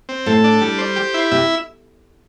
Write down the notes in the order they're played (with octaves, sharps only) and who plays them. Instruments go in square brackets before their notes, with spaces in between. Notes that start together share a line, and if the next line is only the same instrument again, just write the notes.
[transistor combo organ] C4
[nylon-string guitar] A2 [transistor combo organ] A4
[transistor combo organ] D4
G3
C5
G4
E4
[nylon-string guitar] C3 [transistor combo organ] E5